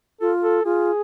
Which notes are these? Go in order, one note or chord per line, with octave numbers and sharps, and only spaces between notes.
F4 A4
A4
F4 G#4